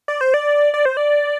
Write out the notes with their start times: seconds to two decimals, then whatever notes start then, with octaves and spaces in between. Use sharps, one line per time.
0.08 D5
0.21 C5
0.34 D5
0.74 D5
0.85 C5
0.97 D5